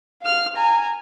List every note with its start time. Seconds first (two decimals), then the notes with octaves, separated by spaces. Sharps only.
0.22 F5 F6
0.56 G#5 A#5